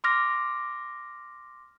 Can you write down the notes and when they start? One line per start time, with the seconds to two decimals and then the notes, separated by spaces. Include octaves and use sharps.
0.04 C6 D6 F6 A#6